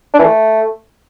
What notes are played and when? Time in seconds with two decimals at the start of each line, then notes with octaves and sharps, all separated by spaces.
0.14 D4
0.19 E3
0.24 A3